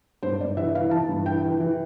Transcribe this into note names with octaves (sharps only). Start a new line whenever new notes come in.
G2 C5
G2 D5
E3 E5
E3 F5
E3 A5
G2
E3 G5
E3
E3